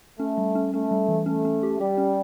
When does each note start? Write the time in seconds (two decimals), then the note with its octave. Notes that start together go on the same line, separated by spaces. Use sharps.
0.20 A3 C#4
0.38 G3
0.55 C#4
0.73 A3 C#4
0.91 G3
1.08 E3
1.26 A3 C#4
1.45 C#4
1.63 G4
1.80 G3 G4
1.98 C#4